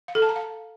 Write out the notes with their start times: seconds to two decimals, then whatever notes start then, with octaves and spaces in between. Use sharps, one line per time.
0.08 F5
0.15 A4
0.22 A5
0.29 A#5
0.36 F5